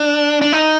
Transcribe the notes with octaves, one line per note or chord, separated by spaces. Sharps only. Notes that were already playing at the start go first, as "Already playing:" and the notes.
Already playing: D4
D4
D#4